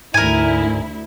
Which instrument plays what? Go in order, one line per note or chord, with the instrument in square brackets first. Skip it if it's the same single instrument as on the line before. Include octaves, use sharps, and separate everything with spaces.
[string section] D2 E4 [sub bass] G#2 [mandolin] A#4 G#5